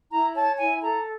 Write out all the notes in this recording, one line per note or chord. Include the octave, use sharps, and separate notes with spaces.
E4 A#5
C#5 A5
E4 G#5
A4 A#5